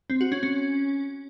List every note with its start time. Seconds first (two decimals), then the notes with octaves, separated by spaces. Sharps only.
0.10 C4
0.21 F#4
0.32 C#4
0.43 C#4